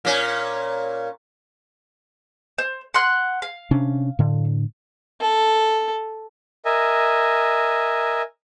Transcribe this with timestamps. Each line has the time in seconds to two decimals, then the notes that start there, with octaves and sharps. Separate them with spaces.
0.05 A#2 C#4
2.58 C5
2.94 F#5 C6 F#6
3.42 F5
3.71 C3 C#4 D4
4.19 A2 D3
5.21 A4
6.65 A#4 D#5 E5 G#5